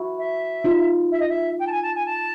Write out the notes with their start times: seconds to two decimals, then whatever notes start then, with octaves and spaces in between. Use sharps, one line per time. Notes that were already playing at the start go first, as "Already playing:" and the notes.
Already playing: E4 F#4
0.18 E5
0.64 D#4 F4
1.12 E5
1.20 D#5
1.29 E5
1.59 G5
1.67 A5
1.72 G#5
1.82 A5
1.95 G#5
2.06 A5